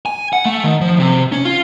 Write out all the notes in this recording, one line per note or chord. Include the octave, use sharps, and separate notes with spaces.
G#5
F#5
A3
D#3
F3
C3
C#4
F4